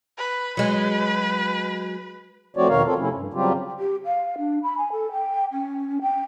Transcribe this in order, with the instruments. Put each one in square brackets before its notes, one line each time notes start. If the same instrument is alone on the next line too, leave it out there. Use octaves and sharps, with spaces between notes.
[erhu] B4
[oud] F#3 G#3 [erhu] B4
[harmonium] F3 A3 C4 F#4 C#5 D5
E2 B2 D#3 A#4 C#5 F5
C4 F4 A4
C3 F3 A3 C#4 E4
G2
C#3 F#3 G3 C4 F4 G4
[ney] G4
F5
D4
B5
G#5
A4
G5
C#4
G5